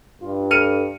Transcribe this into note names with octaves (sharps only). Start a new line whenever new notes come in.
G2 F4
A4 F6 C#7 D#7